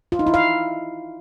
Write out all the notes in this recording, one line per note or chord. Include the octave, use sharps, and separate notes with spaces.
F4
D#4
E4
F5